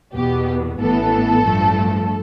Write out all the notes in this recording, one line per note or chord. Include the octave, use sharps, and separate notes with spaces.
E2 B2 B3 G4
A1 A2 E3 B3 A4
G2 F3 A3